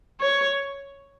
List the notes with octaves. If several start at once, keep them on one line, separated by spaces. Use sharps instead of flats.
C#5